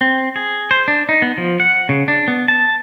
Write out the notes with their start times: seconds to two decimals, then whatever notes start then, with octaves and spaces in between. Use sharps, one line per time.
0.01 C4
0.36 G#4
0.71 C5
0.88 D4
1.09 D#4
1.22 B3
1.38 F3
1.60 F#5
1.89 C#3
2.08 D4
2.28 B3
2.48 A5